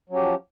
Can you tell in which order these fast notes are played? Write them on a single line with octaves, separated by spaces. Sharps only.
F#3 C#4 G4 F3